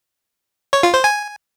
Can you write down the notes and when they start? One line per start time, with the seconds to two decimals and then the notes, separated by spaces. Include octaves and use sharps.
0.73 C#5
0.83 F4
0.94 C5
1.04 G#5